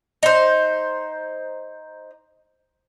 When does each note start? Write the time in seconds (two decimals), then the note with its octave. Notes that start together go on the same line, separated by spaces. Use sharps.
0.23 D#4 C5